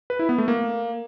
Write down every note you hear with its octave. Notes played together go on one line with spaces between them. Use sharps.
B4
E4
B3
A3
A#3